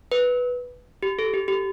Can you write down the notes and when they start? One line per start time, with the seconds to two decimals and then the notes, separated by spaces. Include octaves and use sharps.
0.12 B4
1.03 G4
1.19 A4
1.34 G4
1.48 G4